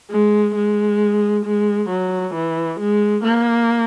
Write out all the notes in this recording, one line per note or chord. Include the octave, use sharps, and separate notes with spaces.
G#3
G#3
G#3
F#3
E3
G#3
A#3